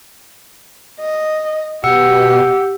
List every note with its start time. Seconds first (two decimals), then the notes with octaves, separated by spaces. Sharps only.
1.00 D#5
1.84 B2 G4 F#5 E6 C#7